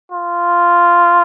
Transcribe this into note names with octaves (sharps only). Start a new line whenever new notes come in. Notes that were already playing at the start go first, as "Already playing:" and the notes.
F4